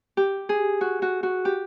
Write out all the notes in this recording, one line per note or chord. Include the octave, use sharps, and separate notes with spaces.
G4
G#4
F#4
F#4
F#4
G4